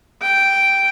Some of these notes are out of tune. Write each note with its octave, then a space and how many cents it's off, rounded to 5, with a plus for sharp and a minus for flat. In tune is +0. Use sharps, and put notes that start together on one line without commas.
G5 -5